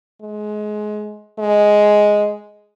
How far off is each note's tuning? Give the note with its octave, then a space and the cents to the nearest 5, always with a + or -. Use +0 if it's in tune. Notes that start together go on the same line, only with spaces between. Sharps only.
G#3 +25
G#3 +5